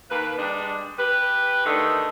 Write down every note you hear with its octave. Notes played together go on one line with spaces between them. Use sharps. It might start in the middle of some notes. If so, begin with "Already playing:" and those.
D#2 A#3 B4
G3 G#3 D4
G4 B4
D3 D#3 A3 D4 D#4